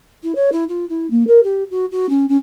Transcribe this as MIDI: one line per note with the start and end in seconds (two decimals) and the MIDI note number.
0.22 0.34 64
0.35 0.49 73
0.52 0.64 64
0.68 0.85 65
0.89 1.06 64
1.10 1.26 58
1.27 1.42 70
1.43 1.63 67
1.70 1.85 66
1.91 2.09 66
2.09 2.25 61
2.28 2.36 61